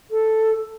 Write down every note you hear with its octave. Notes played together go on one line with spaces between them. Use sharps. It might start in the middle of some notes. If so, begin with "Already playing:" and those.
A4